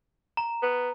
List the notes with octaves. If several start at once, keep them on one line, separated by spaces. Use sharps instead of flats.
A#5
B3